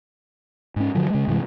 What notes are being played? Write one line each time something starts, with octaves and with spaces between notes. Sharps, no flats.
G#2 C#4
G2 D3 F3 F#3
C#3 G#3
G2 C3 E3 G#3